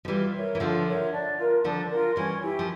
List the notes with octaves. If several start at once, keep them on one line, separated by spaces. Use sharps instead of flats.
F3
E3 G3 F4
A#4 C#5 E5
E3
D3 F3 F4
A#4 C#5 E5
D4
F4 A#4
D3 F3 D4
F4 A#4
E3 G3 C#4
E4 G4
F3